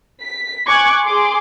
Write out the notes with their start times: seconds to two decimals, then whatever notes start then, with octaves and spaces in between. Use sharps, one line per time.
0.19 B6
0.67 G#5 C#6 D6 F#6 G#6
1.05 G#4 C6 D6